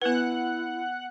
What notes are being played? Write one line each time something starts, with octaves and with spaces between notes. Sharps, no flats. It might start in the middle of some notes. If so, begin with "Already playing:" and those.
B3 E4 B4 F#5 F#6